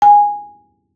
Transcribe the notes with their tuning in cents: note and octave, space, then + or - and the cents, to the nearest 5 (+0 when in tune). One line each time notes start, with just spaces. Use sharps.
G#5 -10